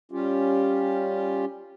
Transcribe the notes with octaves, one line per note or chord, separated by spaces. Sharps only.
G3 C#4 F4 G4